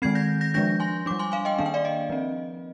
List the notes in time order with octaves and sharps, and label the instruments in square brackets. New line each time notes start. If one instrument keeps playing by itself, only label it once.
[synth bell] D#3 G#3 C4 G#6 C7
G6 A#6
G6 A#6
F3 G#3 D4 G6 A#6
G#5 C6
G3 D4 D6
G#5 C6
F5 G#5
D#5 G5
D#3 A#3 D4 F5
G5
D5 F5
D#5
F3 C4